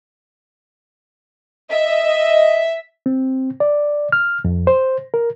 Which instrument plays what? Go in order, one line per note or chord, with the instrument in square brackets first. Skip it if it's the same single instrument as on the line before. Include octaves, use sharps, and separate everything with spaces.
[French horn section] D#5 [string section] E5
[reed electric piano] C4
D5
F6
F2
C5
A#4